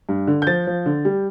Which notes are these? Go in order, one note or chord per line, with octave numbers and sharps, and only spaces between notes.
G2
D3
G6
F3 A6
F3
D3
G3